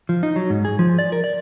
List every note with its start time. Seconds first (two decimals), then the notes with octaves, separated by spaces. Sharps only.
0.09 F3
0.23 D#4
0.36 F#3
0.50 G#2
0.65 G#4
0.79 F3
0.99 D5
1.12 A#4
1.24 D5